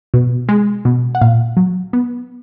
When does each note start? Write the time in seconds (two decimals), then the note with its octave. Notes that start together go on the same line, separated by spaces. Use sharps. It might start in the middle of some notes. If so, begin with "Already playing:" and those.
0.14 B2
0.49 G#3
0.85 B2
1.15 F#5
1.21 A#2 F5
1.57 F#3
1.93 B3